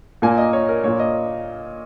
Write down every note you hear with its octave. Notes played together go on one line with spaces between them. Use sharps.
A#2 A#3 G#5
D#5
C#5
A#4
A#2 A#3 C#5
D#5